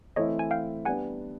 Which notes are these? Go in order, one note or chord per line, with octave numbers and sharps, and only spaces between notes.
E3 A3 C4 E4 C#5 D#5
G#5
F5 G5
G3 B3 D4 F#5 G#5